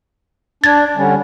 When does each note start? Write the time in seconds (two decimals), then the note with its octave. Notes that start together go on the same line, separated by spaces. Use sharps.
0.64 D4 G#6 A6
0.96 D3 G3 C#4